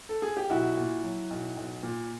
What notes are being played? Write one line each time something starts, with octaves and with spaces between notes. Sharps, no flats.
A4
G#4
G4
B1 E4 F#4
A#2
F#3
B1
B1
A#2